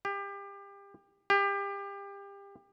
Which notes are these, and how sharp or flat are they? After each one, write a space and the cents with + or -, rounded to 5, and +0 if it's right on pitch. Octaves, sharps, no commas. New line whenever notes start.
G4 +30
G4 +30